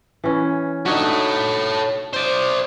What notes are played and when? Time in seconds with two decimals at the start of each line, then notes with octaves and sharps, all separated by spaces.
0.24 E3 C#4
0.86 D4 D#4 F#4 A4 C#5
2.13 C5 D5